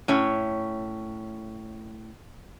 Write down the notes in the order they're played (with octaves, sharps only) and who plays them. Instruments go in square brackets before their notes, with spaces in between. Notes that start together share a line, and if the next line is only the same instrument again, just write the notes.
[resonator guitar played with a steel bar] A2 C#4 C#5